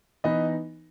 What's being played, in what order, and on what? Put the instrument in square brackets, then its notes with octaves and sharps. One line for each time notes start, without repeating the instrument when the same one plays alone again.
[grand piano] E3 B3 D#4 B4 D#5